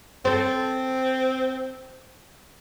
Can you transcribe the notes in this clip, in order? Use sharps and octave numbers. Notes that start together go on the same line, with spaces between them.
C4 A4 C5